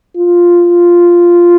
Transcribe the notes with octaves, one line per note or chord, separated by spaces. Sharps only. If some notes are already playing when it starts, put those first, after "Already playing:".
F4